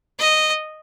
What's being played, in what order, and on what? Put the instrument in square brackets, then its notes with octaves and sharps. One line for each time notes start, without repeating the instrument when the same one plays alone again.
[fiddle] D#5